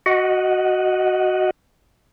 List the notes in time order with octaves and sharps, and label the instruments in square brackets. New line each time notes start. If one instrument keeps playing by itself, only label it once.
[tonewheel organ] F#4 D#5 F#5